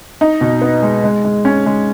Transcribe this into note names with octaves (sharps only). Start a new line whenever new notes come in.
D#4
B2
B3
G#3
G#3
G#3
C#4
G#3